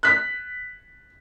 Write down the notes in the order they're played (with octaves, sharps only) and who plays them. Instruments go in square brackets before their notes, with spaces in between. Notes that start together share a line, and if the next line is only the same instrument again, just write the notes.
[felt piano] F#6 B6